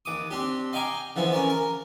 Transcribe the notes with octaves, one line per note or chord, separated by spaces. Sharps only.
D#2 D6 D#6
C4 D4 G4
D#5 F5 G5 G#5 A#5 D6
D3 E3 F3 B3
C#4 A#4 D5
A#4